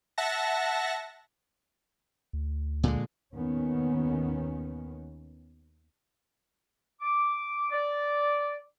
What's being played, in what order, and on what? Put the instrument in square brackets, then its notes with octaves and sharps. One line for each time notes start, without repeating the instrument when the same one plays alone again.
[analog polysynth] E5 F#5 A5 A#6
[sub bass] D2
[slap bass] A#2 D3 G#3
[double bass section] D#2 D#3 B3 C#4
[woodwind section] D6
D5